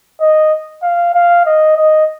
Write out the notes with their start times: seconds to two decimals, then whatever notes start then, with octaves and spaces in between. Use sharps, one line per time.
0.21 D#5
0.83 F5
1.14 F5
1.46 D#5
1.77 D#5